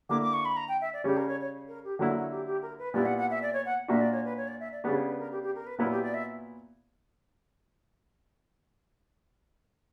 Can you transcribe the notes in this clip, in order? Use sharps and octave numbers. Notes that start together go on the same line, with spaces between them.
D3 A#3 E4 D6
D6
C#6
B5
A#5
G5
E5
D5
C#3 G3 C#4 G4
A#4
C#5
C#5
A#4
G4
D3 F#3 A#3 E4 F#4
F#4
G4
G4
A#4
B4
A#2 G3 B3 E4 D5
F#5
F#5
E5
D5
C#5
F#5
A#2 A#3 D4 F#4 E5
D5
C#5
B4
C#5
D5
E5
D5
C#3 G3 B3 D4 D5
C#5
B4
A#4
G4
G4
A#4
B4
A#2 F#3 B3 E4 A#4
G4
D5
E5